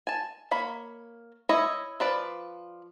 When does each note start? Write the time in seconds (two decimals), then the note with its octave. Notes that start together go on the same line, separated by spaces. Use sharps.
0.07 G#5 A5
0.51 A#3 C#5 B5
1.49 E4 C#5 D#5
2.00 F3 B4 D5